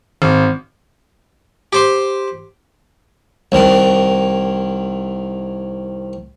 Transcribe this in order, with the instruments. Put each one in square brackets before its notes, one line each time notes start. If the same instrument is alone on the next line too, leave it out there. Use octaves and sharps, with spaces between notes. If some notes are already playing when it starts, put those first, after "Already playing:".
[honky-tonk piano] G#1
[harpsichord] G4 C5 C6
C2 D#3